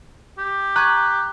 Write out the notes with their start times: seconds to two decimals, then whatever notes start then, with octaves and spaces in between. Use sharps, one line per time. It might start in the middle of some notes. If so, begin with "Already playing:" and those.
0.38 G4
0.76 A#5 C#6 F#6 G#6